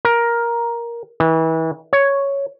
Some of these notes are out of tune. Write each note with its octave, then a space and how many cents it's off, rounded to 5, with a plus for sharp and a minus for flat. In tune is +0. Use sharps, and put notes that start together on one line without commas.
A#4 +10
E3 -35
C#5 +0